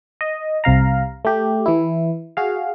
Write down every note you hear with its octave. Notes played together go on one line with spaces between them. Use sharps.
D#5
C2 C3 F5 A#5
A3 G4
E3 E4
F#4 G#4 F5